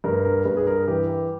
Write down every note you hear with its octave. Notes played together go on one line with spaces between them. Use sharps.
G2 A#4
A#4
G2 B4
G#4
A#4
E3 G4